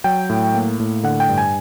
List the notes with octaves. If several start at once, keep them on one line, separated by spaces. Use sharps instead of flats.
F#3 G5
A2
A#3
A2
D3 F#5
G5
G2
G#5